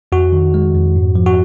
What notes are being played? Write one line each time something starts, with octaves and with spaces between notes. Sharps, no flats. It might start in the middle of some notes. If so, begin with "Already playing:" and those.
F2 F#4
D#3
G#3
F2
G#2
F3
F#4